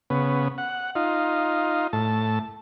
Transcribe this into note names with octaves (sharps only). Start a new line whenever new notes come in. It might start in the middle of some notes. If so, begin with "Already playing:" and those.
C#3 B3
F#5
D#4 F4
A2 A5